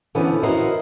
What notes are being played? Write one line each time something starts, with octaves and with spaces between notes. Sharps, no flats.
D3 E3 F3 B3 C#4
E4 F#4 A#4 C5 D#5